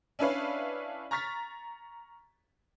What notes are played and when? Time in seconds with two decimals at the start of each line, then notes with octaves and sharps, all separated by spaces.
0.19 C#4 D4 E4 B4 C#5 F5
1.11 A#5 C#6 F6 A6 B6